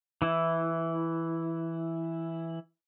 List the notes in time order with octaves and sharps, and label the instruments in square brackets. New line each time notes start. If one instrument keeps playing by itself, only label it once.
[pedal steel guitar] E3 E4